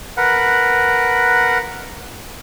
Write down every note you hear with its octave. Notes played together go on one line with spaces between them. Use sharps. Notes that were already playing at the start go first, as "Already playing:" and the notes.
A#4 B4 F#5